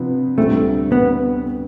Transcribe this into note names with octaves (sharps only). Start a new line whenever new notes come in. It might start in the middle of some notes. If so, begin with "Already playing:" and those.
Already playing: C3 F3 B3 D4
D2 D3 G3 A3 C4
B3